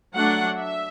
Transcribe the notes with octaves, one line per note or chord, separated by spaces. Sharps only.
F#3 A3 D4 F#5
E5